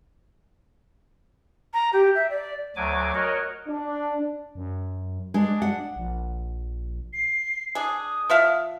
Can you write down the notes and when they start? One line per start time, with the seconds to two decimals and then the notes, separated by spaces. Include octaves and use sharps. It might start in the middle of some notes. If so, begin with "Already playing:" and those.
1.73 A#5
1.92 G4
2.15 E5
2.29 D5
2.76 D2 F#3 G#5 D6
3.14 F#4 A#4 C#5 D#5
3.68 D4
4.55 F#2
5.34 G#3 D4
5.62 F#5
5.96 A#1
7.13 C7
7.75 D4 G#4 D#6
8.30 F3 E5 F5